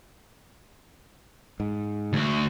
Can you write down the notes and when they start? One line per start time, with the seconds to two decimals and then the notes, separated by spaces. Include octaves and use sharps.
1.60 G#2
2.13 D2 F#4